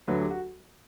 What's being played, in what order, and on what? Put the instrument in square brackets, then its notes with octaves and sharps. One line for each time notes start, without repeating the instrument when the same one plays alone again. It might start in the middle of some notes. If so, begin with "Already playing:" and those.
[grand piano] D2 D3 F#3 B4
G4
F#4